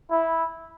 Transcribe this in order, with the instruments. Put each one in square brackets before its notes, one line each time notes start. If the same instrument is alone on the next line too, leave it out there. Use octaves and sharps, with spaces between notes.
[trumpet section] E4